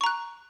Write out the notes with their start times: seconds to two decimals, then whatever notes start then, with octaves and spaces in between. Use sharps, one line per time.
0.01 C#6
0.04 A#5
0.06 F#6